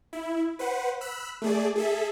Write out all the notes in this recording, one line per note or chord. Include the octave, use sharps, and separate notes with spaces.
E4
B4 C5 F#5
B5 E6 F#6
A3 G#4 D5
G#4 A4 E5